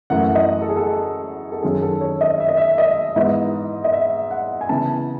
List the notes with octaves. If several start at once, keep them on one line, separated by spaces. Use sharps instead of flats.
F#2 E3 A3 F#5
D#5
A4
G#4
A4
A4
F#2 D#3 F#3 C#4 G#4
A4
C#5
D#5
E5
D#5
E5
D#5
G#2 E3 B3 D#5
D#5
E5
F#5
G#5
C#3 E3 B3 A5